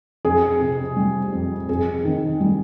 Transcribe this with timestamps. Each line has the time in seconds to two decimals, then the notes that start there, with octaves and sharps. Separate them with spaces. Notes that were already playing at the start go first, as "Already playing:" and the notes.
0.25 F2 G#4
0.61 C3
0.96 G3
1.33 F2
1.69 F2 G#4
2.05 D#3
2.41 G3